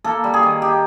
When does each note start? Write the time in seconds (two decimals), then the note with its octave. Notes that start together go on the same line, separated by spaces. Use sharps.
0.04 A#3 A4
0.24 G3
0.34 G#4
0.43 D#3
0.62 G4